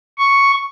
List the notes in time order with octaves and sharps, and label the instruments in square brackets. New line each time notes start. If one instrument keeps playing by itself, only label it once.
[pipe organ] C#6